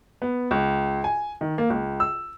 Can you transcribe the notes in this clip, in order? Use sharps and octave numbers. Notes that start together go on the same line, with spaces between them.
B3
C#2
G#5
D#3
A#3
C#2
E6